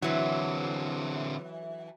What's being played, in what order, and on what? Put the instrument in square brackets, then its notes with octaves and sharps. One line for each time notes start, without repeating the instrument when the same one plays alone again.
[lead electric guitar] D3 C4 [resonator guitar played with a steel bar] E3 F#3